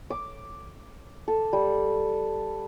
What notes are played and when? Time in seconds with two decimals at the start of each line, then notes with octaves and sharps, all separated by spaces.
0.10 D6
1.28 A4
1.53 G3